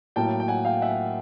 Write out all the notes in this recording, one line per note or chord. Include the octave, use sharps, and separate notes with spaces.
A2 F#3 A#3 G5 A5
G5
F#5 G#5
F5 G5
E5 F#5